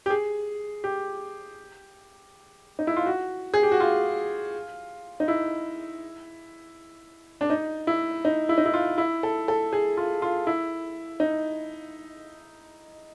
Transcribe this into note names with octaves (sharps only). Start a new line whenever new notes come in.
G4
G#4
G4
D#4
E4
F4
F#4
G#4
G4
F#4
F4
D#4
E4
D4
D#4
E4
D#4
E4
D#4
E4
F4
E4
A4
A4
G#4
F4
F4
E4
D#4